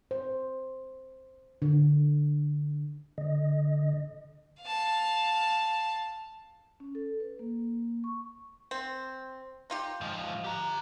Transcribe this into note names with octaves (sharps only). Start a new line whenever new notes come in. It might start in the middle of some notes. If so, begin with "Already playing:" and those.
C5
D3
D3 D#5
F5 A5
C#4
A4
B4
A#3
C#6
C4
D#4 F4 G4
G#2 F3
G4 A#5